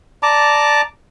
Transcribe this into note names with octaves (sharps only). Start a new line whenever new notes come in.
D5 A5 A#5 D6